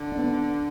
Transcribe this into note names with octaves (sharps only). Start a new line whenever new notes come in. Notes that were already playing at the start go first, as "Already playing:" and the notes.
Already playing: D3
D4
B3